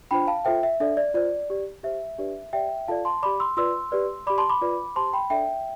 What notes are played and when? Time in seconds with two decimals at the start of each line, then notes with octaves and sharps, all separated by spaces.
0.11 D4 F4 C5 G5 B5
0.27 F5 A5
0.45 F4 A4 C5 E5 G5
0.63 E5
0.80 D4 A4 D5 E5
0.97 D5
1.14 F4 C5 D5
1.50 G4 D5
1.83 G4 C5 E5
2.18 D4 G4 B4 D5
2.53 G4 D5 E5 G5
2.88 F4 A4 D5 F5 A5
3.05 A5 C6
3.23 G4 D5 B5 D6
3.40 C6 E6
3.57 F4 B4 D5 C6 E6
3.92 G4 B4 D5
4.27 G4 D5 B5 D6
4.38 A5 C6
4.49 B5 D6
4.62 F4 B4 D5
4.96 G4 C5 A5 C6
5.13 G5 B5
5.30 D4 A4 D5 E5 G5